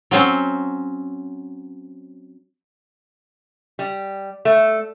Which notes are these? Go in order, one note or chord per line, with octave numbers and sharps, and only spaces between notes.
F#3 C4 C#4 C5
G3
A3